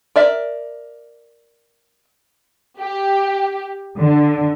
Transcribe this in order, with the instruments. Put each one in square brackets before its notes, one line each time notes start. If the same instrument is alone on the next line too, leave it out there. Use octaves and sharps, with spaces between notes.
[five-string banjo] A#4 D5 E5
[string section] G4
D3